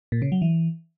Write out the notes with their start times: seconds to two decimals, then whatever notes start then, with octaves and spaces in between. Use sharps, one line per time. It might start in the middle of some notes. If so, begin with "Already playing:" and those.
0.12 A#2
0.22 C#3
0.32 F#3
0.42 E3